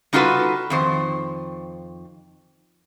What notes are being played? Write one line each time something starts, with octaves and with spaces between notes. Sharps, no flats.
G3 D#4 F4 F#4 A4 B4
F2 D#3 C5